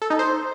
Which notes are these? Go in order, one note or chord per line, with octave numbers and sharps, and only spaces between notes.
A4
D#4
C5